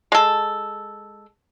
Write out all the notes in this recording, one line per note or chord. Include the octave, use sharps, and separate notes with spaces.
G#3 A4